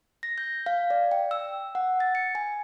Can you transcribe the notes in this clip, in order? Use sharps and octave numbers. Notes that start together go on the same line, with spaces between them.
A#6
G6
F5
D5
G5
E6
F#5
A6
C#7
G#5